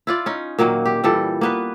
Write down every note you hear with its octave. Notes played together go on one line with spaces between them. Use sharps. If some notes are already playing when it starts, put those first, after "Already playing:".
E4 F4 D5
C#4 D#4
A#2 D#3 F#3 A#3
G4
A#2 E3 G3 A4
A#3 B3 B4